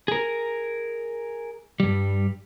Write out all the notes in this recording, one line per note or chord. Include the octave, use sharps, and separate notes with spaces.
G#4 A#4
G2 G3